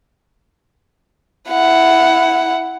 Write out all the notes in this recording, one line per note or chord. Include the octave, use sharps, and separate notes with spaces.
E4 F#5